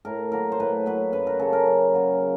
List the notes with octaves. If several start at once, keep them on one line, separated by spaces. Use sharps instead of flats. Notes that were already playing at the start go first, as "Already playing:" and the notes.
A2 A#4
F#3 A#3 A#4
C5
A2 B4
F#3 A#3 B4
F#2 B4
A#4
C#3 F#3 A#3 A4
A#4
F#2
C#3 F#3 A#3
C#3